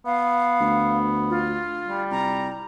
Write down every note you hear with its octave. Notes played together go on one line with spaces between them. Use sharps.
B3 F5
D2
F4
G3
C2 A#5